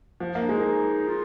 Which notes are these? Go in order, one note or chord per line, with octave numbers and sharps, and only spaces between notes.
F3
A#3
D4
G#3 D#4
F4